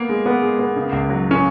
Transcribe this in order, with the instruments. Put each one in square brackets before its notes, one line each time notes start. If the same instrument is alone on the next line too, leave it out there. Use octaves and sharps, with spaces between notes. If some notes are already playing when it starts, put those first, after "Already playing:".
Already playing: [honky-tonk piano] A#3 [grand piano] B3
[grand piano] G#3
B3
G#3
B3
C#3
C#2
F#3
[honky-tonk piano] C#4